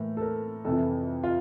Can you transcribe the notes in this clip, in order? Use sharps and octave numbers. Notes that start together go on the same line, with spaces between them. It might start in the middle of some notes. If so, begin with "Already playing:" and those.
Already playing: A2 E3 A#3
A4
A#4
F2 C3 E3 A4
F4